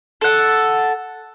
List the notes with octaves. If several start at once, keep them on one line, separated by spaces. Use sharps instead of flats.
A4 F#5